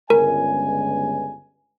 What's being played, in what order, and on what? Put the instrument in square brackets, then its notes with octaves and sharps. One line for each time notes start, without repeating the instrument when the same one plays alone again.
[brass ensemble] G1 C#2 G#5 [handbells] A#4